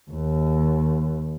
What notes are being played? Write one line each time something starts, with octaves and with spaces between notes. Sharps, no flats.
D#2